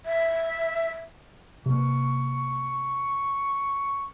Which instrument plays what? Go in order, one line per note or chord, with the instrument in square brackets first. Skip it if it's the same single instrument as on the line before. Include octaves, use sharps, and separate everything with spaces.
[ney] E5
[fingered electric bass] C3 A#3 [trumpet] C#6